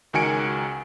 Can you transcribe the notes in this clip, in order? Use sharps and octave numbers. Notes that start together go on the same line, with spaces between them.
C#2 D#3 F#4 G#5 C#7 D7